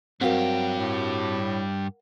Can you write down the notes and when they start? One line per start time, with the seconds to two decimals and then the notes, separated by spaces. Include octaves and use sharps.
0.21 G2 F#3 C4 F#4 G4 A#4 F5 F#5
0.78 A2